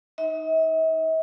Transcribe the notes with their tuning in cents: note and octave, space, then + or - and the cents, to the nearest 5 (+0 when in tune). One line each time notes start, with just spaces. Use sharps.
D#4 +0 E5 -45